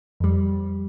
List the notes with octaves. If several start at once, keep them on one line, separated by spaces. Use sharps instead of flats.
F2 G3